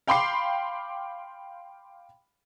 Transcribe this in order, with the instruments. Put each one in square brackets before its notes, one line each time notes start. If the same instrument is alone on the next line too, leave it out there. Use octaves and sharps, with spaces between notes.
[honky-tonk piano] F5 G5 B5 C6 D6 C7